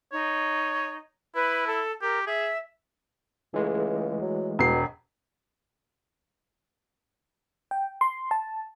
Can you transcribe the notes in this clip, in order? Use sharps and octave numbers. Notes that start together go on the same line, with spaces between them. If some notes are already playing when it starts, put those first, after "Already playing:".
D#4 C#5
E4 B4
A4
G4 A#4
G#4 E5
C#2 E3 G#3 A3
F#3
E1 B2 C7
G5
C6
A5